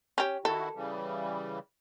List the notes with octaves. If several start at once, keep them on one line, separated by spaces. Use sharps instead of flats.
C#4 G4
D#3 E4 F#4 A4
C#3 E3 G3